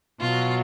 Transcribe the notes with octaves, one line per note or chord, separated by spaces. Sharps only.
B2 F#3 F4